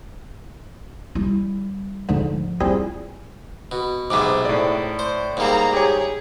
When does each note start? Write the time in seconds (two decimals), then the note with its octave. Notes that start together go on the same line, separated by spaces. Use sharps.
1.15 G3 E4
2.09 D2 G#2 D3 F3
2.60 G3 C4 E4 F4 G#4
3.71 B2
4.10 B1 G#2 C3 B3 D6
4.45 A2 D5
4.99 C5
5.37 G#2 G3 A#3 A#5
5.73 G4 G#4 C#5